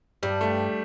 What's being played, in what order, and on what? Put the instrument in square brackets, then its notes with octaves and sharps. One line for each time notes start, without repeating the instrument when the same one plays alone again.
[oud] G2 [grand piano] G3
[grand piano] A3